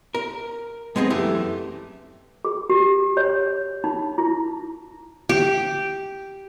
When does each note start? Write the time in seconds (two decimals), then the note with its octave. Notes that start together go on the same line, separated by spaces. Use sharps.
0.15 A#4
0.96 G#3 B3 C4 D#4 G#4
1.10 F#2 E3 A3 G4
2.45 G#4
2.70 G4
3.17 C#5
3.84 D#4
4.18 E4
5.29 G4